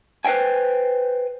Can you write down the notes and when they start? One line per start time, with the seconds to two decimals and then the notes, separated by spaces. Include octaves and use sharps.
0.25 B4 C5 E5 G5 G#5